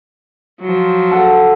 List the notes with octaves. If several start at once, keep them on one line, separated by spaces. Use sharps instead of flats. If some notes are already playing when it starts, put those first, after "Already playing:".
F3 F#3
A4 F#5